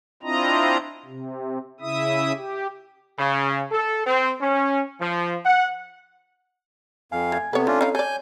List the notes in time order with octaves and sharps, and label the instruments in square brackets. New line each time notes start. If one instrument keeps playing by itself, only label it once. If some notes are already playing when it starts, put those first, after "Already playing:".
[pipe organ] C4 D4 E4 F4 D#5 A#5
C3
C#3 E4 E5 D#6
G4
[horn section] C#3
A4
C4
C#4
F3
F#5
[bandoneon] F2 F5 [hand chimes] G#5
[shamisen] A3 [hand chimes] G#6
[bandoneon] C3 B3 [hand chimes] C4 A4 [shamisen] B4 C#5
[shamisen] A3 [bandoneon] C#4 D4 F4
[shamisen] C#4 D#4 E4 [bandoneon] F5
[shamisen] A4 D5 [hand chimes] C#5 [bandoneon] G#5 G6